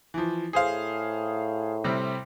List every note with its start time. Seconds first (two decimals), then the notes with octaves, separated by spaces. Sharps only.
0.14 E3 F3
0.53 A2 G#4 C5 F5
1.84 C3 G3 C4